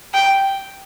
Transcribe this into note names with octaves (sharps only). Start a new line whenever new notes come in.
G5